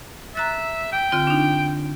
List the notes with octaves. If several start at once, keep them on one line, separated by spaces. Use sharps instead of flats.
E5 A#5 F#6 A6
G5
D3 C4 F4
D4 D#4